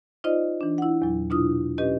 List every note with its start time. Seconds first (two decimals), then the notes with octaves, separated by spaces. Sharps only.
0.24 D#4 F4 C5 D5 D#5
0.61 E3 D4
0.78 E4 F#5
1.02 E2 A#2 F#3
1.30 B2 D4 E4 F4 D#6
1.78 B2 C#4 G4 B4 D#5